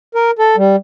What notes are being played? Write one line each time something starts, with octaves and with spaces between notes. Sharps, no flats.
A#4
A4
G3